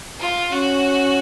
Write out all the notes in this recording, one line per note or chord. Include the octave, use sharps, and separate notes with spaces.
F4
C#4 F#4